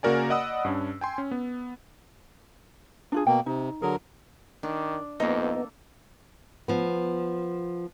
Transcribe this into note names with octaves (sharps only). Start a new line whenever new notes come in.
C#3 A#3 F#4 A#4 D5 G#5
D5 D#5 F#5 B5 D#6 E6
G2 C#4 D4
G5 G#5 C6
C#4
B3
D4 F4 G#4
B2 A#3 G5
C3 D#4
D3 F#3 G#4 A#4
D#3 D4
F2 A#3 B3 D#4 A4
F3 B3